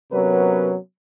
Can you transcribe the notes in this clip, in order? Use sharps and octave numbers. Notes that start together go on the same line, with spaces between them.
C3 F#3 B3 C#4 A#4 B4